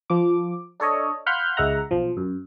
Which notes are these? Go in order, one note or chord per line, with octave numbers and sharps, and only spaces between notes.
F3 D6
D4 A4 C#5 D#5
F5 F#5 B5 C6 F6 G6
C#2 G#3 E5 F#5 A#5
B1 F3
F#2